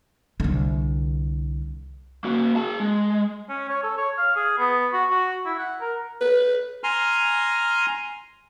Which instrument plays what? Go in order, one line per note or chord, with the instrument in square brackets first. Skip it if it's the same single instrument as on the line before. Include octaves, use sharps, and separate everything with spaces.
[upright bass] C2 D3
[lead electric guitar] A#3 F#4
G#4 A5
G#3
[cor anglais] C#4
C#5
A4
C#5
F5
G#4
B3
F#4
F#4
E4
F#5
A#4
[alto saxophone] B4
[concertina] G#5 A#5 C6 F6